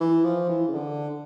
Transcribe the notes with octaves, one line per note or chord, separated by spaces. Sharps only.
E3
F3
E3
C#3
D3